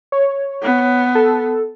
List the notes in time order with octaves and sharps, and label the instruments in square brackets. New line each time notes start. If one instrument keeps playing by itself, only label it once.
[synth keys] C#5
[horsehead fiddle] B3
[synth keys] A4